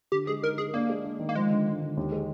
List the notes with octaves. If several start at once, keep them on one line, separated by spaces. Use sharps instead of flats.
D3 G4
G#3 G#4
D#4 A#4
D#4 G#4
A#3 D4
G#3
D4
D#3
A#3
F3 G#3
D3
D3
D3
D#2
G#3